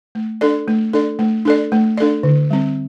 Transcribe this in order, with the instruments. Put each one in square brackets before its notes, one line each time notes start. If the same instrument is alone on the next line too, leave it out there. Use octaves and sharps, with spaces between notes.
[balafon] A3
D4 A4 D5
A3
D4 A4 D5
A3
D4 A4 D5
A3
D4 A4 D5
D3
G3 C4